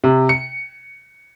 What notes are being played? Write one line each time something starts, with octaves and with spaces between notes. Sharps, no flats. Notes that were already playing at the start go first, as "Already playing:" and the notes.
C3
C#7